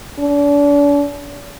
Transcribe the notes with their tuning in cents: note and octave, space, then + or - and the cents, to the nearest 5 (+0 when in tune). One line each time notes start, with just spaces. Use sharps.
D4 -40